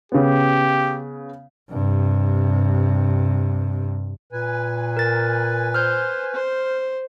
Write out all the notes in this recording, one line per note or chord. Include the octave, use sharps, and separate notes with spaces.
C#3 B3 G4
G2 C3
A#2 B4 G#5
A#4 A6
C5 F6 G6
C5